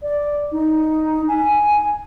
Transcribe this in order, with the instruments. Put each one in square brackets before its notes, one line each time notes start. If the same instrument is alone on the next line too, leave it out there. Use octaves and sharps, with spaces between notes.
[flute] D5
D#4
G#5